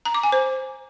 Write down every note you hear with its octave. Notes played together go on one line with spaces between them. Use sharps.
A#5
D6
G#5
C5